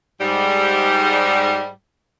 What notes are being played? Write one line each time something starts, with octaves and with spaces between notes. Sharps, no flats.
G#2 G3